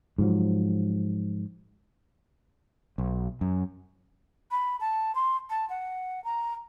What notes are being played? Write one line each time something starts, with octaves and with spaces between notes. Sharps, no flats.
G#2 F3 F#3
B1
F#2
B5
A5
C6
A5
F#5
A#5